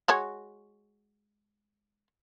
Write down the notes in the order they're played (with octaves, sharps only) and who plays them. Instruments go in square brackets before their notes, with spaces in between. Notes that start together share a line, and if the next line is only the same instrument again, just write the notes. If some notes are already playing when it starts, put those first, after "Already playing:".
[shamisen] G#3 F#4 C#5